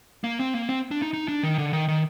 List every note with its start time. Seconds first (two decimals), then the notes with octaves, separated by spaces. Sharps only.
0.24 A#3
0.39 C4
0.54 A#3
0.69 C4
0.91 D4
1.02 D#4
1.13 D#4
1.28 D4
1.43 D#3
1.58 D3
1.73 D#3
1.88 D#3